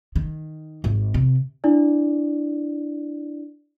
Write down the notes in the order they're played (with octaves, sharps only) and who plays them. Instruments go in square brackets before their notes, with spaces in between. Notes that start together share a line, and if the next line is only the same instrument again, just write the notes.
[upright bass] D#3
G#1
C3
[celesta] D4 E4 D5